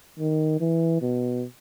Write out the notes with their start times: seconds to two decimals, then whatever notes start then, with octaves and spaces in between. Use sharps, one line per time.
0.19 D#3
0.60 E3
1.02 B2